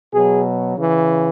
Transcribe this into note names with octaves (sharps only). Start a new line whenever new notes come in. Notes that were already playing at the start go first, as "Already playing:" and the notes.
B2 F#3 G#4
C#3 E3